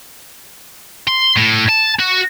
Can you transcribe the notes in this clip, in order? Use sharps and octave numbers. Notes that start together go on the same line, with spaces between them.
C6
A2
A5
F#4